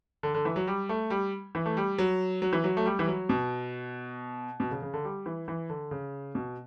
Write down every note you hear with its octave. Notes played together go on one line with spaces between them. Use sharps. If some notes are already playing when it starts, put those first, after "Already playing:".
D3
D3
E3
F#3
G3
A3
G3
E3
A3
G3
F#3
F#3
E3
F#3
A3
G3
E3
F#3
B2
B2
C#3
C#3
D3
G3
E3
E3
D3
C#3
B2